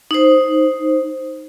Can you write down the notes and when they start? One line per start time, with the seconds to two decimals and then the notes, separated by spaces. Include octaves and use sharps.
0.11 D#4 C5